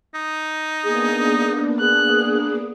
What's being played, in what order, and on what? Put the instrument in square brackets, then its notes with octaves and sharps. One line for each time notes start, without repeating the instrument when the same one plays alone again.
[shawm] D#4
[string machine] A#3 B3 D4 [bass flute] G#4
[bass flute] G#4 [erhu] F#6